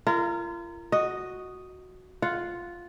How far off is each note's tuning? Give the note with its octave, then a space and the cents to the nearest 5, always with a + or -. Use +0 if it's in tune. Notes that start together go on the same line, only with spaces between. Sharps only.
F4 -40 A#4 -15
F#4 +0 D#5 +0
F4 +0 F#5 -5